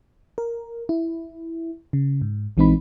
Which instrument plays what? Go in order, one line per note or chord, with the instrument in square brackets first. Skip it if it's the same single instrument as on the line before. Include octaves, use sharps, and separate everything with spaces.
[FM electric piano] A#4
E4
C#3
G#2
A#1 E3 G#3 C4 D#4 B5